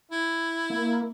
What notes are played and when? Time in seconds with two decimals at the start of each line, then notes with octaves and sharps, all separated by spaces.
0.11 E4
0.70 A#3